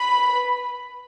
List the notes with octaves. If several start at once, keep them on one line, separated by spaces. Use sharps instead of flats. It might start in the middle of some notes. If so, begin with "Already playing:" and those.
Already playing: B4 B5